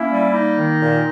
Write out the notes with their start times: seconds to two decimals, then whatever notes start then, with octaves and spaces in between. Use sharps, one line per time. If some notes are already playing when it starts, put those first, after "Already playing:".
Already playing: A#3 C#4 E4
0.09 G3
0.32 A#3 D#4
0.56 D#3
0.81 A#2